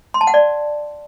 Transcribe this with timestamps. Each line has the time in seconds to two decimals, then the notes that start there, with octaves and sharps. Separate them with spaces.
0.14 C6
0.21 A5
0.27 F#5
0.34 D5